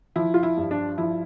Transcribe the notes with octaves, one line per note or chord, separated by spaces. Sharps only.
F3 E4
F4
E4
G2
D4
F3 E4